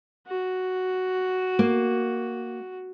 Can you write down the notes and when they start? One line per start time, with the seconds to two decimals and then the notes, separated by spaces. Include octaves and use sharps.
0.27 F#4
1.59 A#3